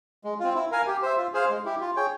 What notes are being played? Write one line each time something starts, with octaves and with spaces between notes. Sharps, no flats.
G#3
C4 F4
E4
A#4 F5 G#5
G4
C5 E5
F4
G#4 C5 F5
G#3
E4 G4
F4
G#4 C#5 G5